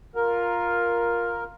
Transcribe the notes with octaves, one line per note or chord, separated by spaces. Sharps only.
F4 A#4